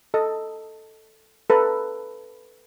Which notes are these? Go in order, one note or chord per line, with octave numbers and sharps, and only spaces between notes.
A4 D#5
A4 B4 A#5